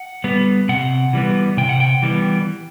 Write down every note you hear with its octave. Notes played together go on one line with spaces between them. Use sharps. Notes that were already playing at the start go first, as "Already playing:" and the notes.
Already playing: F#5
G3 B3
C3 F#5
E3 G3 B3
C3 G5
F#5
G5
E3 G3 B3